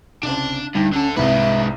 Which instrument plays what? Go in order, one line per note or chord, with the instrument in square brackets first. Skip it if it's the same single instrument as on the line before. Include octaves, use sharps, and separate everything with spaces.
[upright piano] C2 C#3 C4 [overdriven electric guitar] D4 A5
[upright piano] D2 [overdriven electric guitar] G2 [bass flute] D#4
[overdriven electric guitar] D3 A4 [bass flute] C#4
[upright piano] C2 G#2 [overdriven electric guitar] G#3 B4 [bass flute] E5